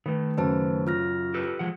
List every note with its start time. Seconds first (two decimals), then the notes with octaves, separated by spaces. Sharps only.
0.06 D#3 A3 B4
0.38 F#2 C#3 B4 C5 A5
0.87 F4 F6 A#6
1.34 G4 A4 B4
1.59 F3 G#3 F#5